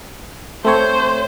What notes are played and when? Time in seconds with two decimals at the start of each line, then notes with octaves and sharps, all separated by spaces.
0.65 A3 C4 C5 C#5